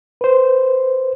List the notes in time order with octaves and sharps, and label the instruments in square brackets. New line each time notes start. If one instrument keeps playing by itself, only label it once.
[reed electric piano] B4 C5